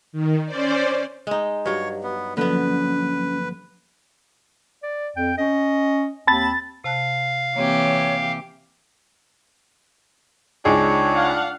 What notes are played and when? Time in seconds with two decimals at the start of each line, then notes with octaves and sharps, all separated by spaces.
0.12 D#3
0.46 C#4 C5 D5
1.27 G#3 D#4
1.66 G2 F#3 G4 C#5
2.03 B3
2.37 D3 F3 F#3 A#3 B3 C#4 B4
4.83 D5
5.16 F2 G5
5.38 C#4 D#5
6.27 D#2 C4 A5 B5 A6
6.84 C3 F5 A5 F#6
7.56 E3 A#3 C4 G4 C#5
10.65 C#2 D4 D#4 G#4 C#5
11.14 F5 F#5